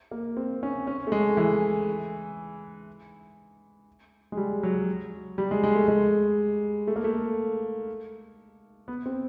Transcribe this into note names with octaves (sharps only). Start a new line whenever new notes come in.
A#3
C4
C#4
C#4
A3
G#3
E3
G#3
G3
F#3
G3
G#3
G#3
A3
G#3
A3
A#3
A3
B3
C4